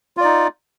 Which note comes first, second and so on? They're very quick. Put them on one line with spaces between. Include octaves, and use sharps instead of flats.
F4 D5 D#4